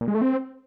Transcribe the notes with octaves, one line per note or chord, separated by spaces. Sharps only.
A#2
G#3
A3
C4